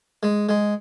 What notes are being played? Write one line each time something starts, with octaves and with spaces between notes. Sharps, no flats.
G#3
G#3